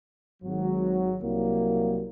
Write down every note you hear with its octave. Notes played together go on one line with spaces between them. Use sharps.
G#1 F#3
C2 F#3 A#3